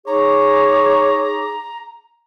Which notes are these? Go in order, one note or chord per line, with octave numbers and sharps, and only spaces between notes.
D#4 G#4 C#5 A#5 D6